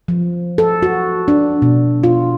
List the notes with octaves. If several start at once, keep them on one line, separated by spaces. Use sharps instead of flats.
F3
A4
F#4
D4
B2
F4